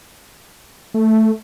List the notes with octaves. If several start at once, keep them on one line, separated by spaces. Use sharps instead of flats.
A3